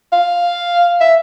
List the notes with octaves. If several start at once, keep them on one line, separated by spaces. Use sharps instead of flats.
F5
E5